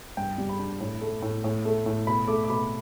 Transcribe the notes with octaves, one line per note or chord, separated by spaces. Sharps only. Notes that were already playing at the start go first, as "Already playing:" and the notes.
G2 G5
G3
B5
D4
A2
A3
A2
A2
A3
A2
B2 B5
A3 D6
D6
B2 B5